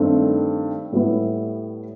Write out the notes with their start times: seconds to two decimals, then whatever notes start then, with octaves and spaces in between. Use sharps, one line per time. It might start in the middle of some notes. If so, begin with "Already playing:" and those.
Already playing: G2 D#3 A3 C4
0.92 A2 G3 B3 E4